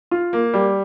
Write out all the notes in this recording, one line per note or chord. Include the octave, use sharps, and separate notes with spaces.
F4
A#3
G3